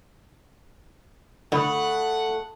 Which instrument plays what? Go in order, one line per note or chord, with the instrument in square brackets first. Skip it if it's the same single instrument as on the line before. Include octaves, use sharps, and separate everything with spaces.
[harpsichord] D3 [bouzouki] A3 [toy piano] F4 B5 D#6 [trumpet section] F#5